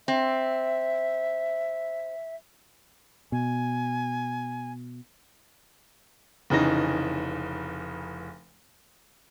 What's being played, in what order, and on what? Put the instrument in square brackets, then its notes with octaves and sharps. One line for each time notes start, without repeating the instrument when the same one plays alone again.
[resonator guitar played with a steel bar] C4 [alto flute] E5
[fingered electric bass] B2 [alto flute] G#5
[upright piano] F1 C#3 E3 D#4 A#6